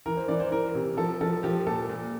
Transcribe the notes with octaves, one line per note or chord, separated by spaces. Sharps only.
E3 A#4
C5
E3 D5
C5
E3 A#4
C3
F3 A4
F3 A4
F3 G4
A#2 A4
A#2